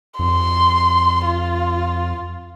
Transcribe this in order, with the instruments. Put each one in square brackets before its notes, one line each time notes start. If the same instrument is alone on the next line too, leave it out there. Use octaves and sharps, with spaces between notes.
[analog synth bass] F2 [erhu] C6
[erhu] F4